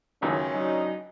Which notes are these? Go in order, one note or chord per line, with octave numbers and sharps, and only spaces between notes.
C#2 F#2 D#3 C#4
F#3 D4 D#4